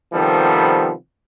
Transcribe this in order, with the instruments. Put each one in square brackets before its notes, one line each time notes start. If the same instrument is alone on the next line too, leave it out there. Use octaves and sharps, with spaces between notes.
[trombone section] C3 D#3 F3 G3 B3 A4